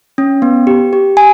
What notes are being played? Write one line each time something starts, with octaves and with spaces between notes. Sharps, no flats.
C#4
B3
G4
G4
G4 G#5